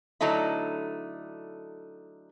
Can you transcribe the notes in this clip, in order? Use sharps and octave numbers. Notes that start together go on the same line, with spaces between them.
D3 F#3 A3 D#4 E4